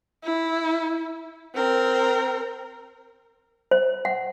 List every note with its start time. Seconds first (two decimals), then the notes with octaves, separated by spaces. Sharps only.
0.24 E4
1.55 C4 A#4
3.71 C5
4.05 F#5